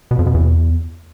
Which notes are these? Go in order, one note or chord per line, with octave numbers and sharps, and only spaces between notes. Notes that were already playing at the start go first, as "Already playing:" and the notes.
B2
F2
B2
E2